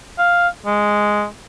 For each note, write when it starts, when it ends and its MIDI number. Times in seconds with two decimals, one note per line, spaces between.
0.18 0.48 77
0.66 1.26 56